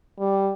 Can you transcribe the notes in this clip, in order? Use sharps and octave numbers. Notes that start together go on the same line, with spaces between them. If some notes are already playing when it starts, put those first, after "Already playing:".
G3